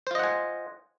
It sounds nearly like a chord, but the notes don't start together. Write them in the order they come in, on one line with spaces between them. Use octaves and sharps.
C5 F4 D#5 F#5 G#5